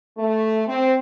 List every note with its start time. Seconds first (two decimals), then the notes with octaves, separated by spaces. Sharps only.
0.18 A3
0.67 C4